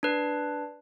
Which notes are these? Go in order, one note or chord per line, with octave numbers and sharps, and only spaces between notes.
D4 B4